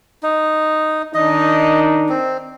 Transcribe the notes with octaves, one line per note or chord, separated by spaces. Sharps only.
D#4
D#3 D4 D#4 D#5
C4